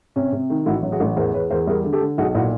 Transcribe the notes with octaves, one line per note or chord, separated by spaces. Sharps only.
C3 C#4
C3
D#3
A1 E4 F#4
F#3
F#4 G#4
A1
E2 A#4 C5
E2 B4 C#5
E2 A#4 C5
G3 G#4 A#4
D3
G4 A4
D3
B1 F#4 G#4
A#2 E4 F#4